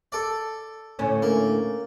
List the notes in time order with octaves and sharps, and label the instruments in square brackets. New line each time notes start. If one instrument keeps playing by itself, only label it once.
[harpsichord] A4 D5
[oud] D2 A2 C#4
[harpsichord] A#3